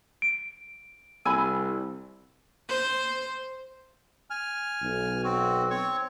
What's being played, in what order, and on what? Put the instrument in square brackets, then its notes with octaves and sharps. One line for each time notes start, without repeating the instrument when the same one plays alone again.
[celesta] D7
[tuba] C2 [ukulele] G#5 B5 [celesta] E6
[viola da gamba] C5
[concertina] G#5 F6
[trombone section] B1
[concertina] C4 F#4
C4 C#5 C#6